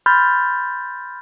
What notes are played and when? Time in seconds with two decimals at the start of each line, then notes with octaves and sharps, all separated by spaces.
0.06 B5 C6 F6 G6 A6